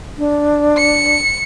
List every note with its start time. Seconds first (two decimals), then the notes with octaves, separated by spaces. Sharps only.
0.18 D4
0.77 C#7